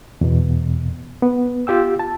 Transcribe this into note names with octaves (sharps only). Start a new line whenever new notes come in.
E2 B2
B3
F4 G4 G5 E6
A5